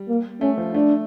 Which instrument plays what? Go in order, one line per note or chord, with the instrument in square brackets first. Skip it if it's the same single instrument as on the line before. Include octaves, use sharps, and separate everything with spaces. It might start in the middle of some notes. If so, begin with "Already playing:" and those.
Already playing: [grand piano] G3
[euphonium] A#3
[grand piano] A3 [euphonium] C#4
[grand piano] F3
[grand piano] A3 [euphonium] D4